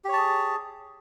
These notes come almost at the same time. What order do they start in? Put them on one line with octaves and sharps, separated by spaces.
G4 C#5 A5 G#4